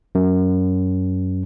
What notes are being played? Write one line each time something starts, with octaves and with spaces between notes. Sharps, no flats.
F#2